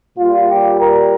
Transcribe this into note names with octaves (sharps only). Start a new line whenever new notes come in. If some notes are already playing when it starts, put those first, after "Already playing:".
A#2 G3 F4
G4
A#4